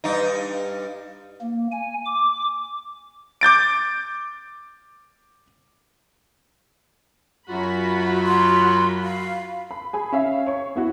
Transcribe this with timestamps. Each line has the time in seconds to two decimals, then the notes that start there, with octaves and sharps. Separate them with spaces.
0.04 G2 D#4
1.41 A#3
1.72 G#5
2.06 D6
3.41 D6 G6 A6 D7
7.49 F#2 F#3 F4 F#4 B5
8.26 C6
9.03 F5
9.71 B5
9.93 G#4 G#5 B5
10.12 C#4 E5 F5
10.46 C#5 C#6
10.76 B3 E4 F#4